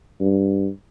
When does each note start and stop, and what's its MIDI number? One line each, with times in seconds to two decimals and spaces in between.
0.20 0.69 43